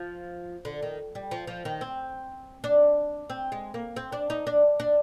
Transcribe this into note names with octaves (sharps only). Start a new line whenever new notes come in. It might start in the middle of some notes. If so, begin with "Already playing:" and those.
Already playing: F3
D3
D#3
G3
F3
F3
D#3
C4
D4
C4
G#3
A#3
C4
D4
D#4
D4
D4